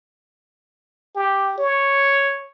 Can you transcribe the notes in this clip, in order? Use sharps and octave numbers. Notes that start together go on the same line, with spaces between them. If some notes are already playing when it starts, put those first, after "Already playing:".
G4
C#5